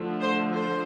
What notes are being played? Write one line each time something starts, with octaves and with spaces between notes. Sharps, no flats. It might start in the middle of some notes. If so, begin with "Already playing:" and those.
Already playing: D3 F3 A3
C5
C5